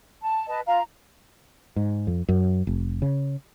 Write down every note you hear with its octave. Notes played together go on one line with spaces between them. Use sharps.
A5
B4 D#5 A5
F4 F5 A#5
G#2
F2
F#2
F1
C#3